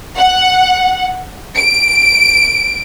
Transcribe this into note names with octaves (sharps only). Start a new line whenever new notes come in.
F#5
D7